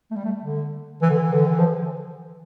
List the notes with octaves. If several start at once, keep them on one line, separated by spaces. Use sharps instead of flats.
A3
G3
A3
D3
E3
D3
E3
D3
E3
F3